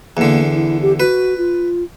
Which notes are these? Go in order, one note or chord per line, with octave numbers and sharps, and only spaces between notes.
E2 D3 A#3
E4
G4
F#4 B4
F4